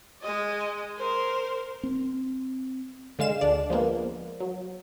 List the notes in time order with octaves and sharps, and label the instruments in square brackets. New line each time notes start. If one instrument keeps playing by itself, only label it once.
[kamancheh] G#3 D#5
A#4 C5
[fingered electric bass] C4
[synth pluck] D3 G#3 F5 E7
D2 D4 D5
F3 G#3 A#3 B3
F#3